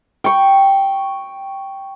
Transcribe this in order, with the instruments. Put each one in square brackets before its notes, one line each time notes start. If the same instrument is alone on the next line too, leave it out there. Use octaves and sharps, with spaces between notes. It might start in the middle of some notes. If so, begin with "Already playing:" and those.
[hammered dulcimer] G5 C#6